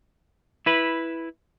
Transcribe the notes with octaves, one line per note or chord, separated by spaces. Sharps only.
E4 B4